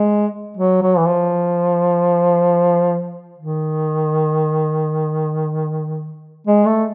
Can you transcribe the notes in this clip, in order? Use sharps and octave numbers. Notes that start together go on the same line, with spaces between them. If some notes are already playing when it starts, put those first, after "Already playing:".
Already playing: G#3
F#3
F#3
E3
F3
D#3
G#3
A3